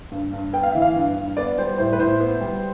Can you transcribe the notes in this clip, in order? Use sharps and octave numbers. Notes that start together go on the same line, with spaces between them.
G2
G2
B3 G5
F5
E3 E5
F5
G2
G2
B3 D5
G3 C5
A2 C5
B4
A2 C5
B3
G3